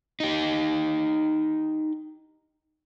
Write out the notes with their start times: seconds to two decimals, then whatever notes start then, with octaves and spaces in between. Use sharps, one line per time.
0.20 D#4 G4